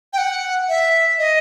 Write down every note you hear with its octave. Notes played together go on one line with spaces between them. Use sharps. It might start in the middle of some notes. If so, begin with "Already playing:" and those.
G5
F#5
E5
D#5